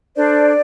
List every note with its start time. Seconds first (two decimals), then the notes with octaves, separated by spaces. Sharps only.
0.15 D4 A4 C5 D5